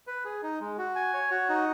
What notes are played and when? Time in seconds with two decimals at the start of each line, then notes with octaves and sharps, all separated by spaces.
0.07 B4
0.25 G#4
0.43 D#4
0.61 G#3
0.78 F#4
0.96 G#5
1.14 C#5
1.31 F#4
1.49 D#4